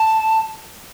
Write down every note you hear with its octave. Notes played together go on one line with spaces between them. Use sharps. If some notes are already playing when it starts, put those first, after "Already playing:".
Already playing: A5